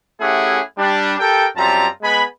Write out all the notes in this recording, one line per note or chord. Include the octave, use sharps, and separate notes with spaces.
A3 C#4 E4 G4 G#4 F#5
G3 D4
G4 A4 A#4 G5
F#2 G3 C4 F4 A5 A#5
G#3 B3 G#5 B5